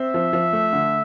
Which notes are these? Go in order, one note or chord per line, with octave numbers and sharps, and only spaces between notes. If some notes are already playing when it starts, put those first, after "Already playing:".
Already playing: C4 E5
F3
F3
A3
D3